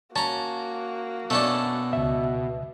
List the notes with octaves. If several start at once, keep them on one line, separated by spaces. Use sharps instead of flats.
A#3 C#4 F#4 A5 A#5
B2 A3 C#4 D4
C#2 E5